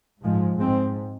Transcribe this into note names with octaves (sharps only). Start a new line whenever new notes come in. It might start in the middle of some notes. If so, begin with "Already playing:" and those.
G#2 F3 G#3
G#2 G#3 C4